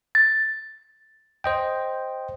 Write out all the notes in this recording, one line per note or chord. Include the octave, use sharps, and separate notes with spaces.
A6
C5 D#5 G5